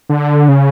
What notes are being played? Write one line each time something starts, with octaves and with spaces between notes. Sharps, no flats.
D3
C#3